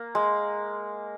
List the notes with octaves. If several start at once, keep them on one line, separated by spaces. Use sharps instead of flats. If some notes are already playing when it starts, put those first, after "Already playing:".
Already playing: A#3
G#3